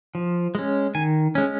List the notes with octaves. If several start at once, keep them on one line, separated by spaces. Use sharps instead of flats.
F3
G#3 C#4
D#3 G#5
G#3 C#4